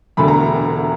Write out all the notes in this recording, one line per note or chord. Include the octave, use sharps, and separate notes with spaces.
E1 D2 D3 B5
A#5